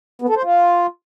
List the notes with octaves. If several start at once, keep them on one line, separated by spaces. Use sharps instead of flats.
B3
A4
C5
F4